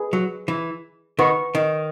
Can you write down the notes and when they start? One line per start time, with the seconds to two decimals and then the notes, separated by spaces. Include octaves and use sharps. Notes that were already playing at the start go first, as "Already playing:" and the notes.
Already playing: G#4 B4
0.13 F#3
0.48 E3
1.19 D#3 B4 F#5 C#6
1.55 D#3